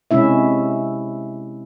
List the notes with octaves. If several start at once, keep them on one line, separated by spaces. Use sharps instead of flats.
C3 G#3 C#4 E4 E5